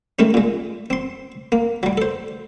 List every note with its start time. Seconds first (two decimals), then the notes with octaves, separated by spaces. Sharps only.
0.19 D#3 G#3 A3 C#4
0.34 A#2 G#3
0.90 C4 C6
1.52 A#3
1.83 F#3 G3
1.97 A4 C5